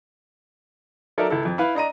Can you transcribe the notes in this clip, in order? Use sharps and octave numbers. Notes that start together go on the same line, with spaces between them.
F#3 D#4 A4 A#4 D5 E5
C#2 E4 A4
F2
E4 B4 F5
D4 D#5 A#5 D#7